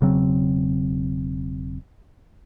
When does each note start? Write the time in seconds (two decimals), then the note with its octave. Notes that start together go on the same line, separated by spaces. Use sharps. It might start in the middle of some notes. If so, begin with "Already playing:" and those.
0.01 E1 C#3 F#3 C4